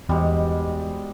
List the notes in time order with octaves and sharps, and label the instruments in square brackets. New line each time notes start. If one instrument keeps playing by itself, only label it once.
[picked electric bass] E2 [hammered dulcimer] G#2 B2 G3